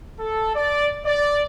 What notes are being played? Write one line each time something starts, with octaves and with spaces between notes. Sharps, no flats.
A4
D5
D5